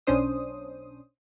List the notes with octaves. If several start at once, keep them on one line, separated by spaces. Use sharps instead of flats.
B1 C#4 D4 C5 D#6